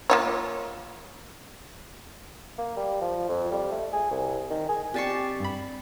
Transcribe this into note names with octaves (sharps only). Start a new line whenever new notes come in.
A#3 F4 C#5
A#3
G3
F3
F2
G3
A3
G#4
C2
D#3
G#4
C4 G4 D5 A5 C#6 C7
G2 B5